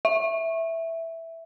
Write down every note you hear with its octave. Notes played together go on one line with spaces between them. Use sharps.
E5